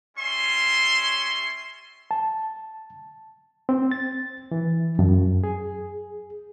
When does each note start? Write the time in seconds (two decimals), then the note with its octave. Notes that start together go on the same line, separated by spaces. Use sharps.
0.17 G3 C#4 C#5 E5 C6
2.11 A5
3.69 C4
3.91 A6
4.52 E3
4.99 F#2
5.44 G#4